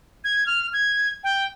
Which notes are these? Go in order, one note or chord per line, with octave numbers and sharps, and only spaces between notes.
G#6
F6
G#6
G5